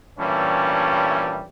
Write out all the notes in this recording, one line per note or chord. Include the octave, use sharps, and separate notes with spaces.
G2 A#2 E3 G3 A3 C#4